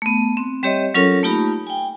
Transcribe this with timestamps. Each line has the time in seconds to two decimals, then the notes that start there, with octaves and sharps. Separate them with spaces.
0.02 A3 B3
0.37 C4
0.63 G3 C4 G4 C#5 D#5 E5
0.94 F#3 C#4 F4 A4 A#4 C#5
1.23 A3 A#3 D#4 F4 G4 B5
1.67 G5 G#5